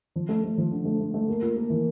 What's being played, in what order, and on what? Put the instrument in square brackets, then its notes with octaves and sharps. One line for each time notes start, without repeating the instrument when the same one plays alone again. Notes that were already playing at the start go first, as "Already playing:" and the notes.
[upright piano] F3
A3
A3
F3
D3
A3
A3
A3
A#3
F4
A#3
E3